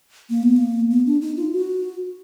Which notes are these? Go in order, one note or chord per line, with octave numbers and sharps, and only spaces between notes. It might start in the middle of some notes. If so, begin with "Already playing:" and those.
A#3
B3
A#3
B3
D4
D#4
F4
F#4